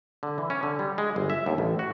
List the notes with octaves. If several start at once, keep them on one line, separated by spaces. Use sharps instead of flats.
D3
E3
C#4
D3
G3
G#3
G1
E5
D#2
A1
F#4